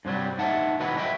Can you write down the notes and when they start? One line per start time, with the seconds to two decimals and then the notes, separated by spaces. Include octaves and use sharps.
0.05 G2 C3 F#3 G3
0.39 D#4 E5 F#5 A5
0.80 D#3 E3 F#3 F#4 B4
0.97 F#4 D#5 E5 G5